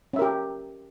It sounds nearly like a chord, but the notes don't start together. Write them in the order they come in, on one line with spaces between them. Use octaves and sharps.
C#4 E5 A#4 G4